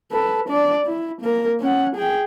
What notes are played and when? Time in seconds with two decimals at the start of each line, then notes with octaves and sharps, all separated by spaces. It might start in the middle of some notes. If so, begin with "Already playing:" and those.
0.12 A4 B4
0.49 D4 D5
0.86 E4
1.22 A#3 A#4
1.60 C#4 F#5
1.96 G#4 G5